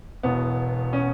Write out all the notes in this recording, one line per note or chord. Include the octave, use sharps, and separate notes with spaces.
E1 E2 B2 B3
C#4